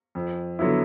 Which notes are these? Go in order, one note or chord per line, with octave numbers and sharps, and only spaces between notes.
F2
D3 F#3 B3 E4